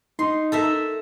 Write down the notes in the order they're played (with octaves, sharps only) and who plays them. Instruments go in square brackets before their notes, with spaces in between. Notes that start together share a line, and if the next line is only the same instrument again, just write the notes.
[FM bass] D#4 [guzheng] C6
[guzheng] A4 A#4 E5